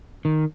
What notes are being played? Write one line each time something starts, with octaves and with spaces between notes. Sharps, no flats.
D#3